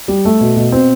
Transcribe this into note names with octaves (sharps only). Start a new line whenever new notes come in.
G3
A3
B2
B2
C4